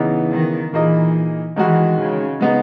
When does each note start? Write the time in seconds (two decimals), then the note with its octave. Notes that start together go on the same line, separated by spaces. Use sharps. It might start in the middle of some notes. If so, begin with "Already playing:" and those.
Already playing: C#3 E3 B3 D#4
0.31 D#3
0.73 A#2 E3 A#3 D#4 G#4 D#5
1.56 D#3 E3 G#3 D#4 F#4
1.98 C#3
2.39 C#3 G#3 B3 D#4